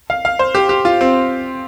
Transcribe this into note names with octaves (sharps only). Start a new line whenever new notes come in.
F5
F5
C5
G4
G4
F4
C4